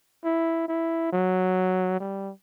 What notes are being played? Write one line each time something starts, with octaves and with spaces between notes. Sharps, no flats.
E4
E4
F#3
G3